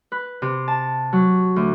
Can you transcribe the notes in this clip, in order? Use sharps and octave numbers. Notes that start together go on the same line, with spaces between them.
B4
C3
A5
F#3
D2